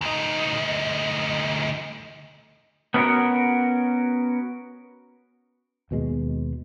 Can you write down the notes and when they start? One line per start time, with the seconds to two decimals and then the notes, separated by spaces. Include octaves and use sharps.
0.01 D2 D#4
2.94 B3 C#4 D4 F4 F#4 A#4
5.91 D#2 B2 G#3